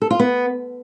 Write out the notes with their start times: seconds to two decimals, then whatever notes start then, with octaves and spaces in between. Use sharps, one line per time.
0.02 A4
0.11 F4
0.19 B3